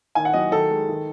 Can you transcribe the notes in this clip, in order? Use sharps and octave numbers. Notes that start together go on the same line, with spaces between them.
D#3 G#5
F#5
F#3 D#5
D#3 A4
G#3
D#3